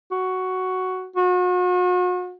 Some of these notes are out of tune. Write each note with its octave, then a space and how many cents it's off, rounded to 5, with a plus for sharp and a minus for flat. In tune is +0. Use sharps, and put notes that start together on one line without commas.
F#4 +5
F#4 -40